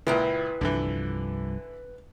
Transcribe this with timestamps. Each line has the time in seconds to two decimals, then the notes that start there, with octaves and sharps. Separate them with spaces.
0.07 C#2 A#2 E4 B4 G5 A#5
0.61 C2 G2 D3 E3 F3